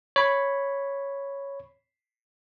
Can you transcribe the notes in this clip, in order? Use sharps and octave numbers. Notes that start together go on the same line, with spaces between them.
C#5 B5